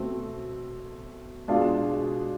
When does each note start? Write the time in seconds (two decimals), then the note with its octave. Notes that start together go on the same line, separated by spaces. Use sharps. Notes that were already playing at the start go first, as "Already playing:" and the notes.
Already playing: B2 A3 C4
1.48 B2 G#3 D4 F4